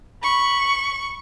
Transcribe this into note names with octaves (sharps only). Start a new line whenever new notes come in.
B5 C#6